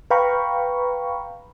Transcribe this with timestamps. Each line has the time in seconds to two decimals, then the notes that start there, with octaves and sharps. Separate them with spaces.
0.11 B4 F5 G5 A#5 B5 C#6